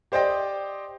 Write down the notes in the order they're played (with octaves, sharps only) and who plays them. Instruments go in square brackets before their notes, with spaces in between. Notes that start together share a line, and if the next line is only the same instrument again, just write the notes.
[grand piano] G4 C5 D5 D#5 G5